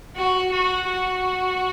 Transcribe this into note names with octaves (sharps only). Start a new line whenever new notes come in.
F#4
F#4
F#4